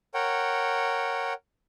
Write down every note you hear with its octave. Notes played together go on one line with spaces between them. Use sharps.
A#4 C#5 F#5 G5